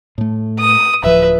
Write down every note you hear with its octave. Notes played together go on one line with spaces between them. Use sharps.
A2 A3
D#6
D1 F3 B4 E5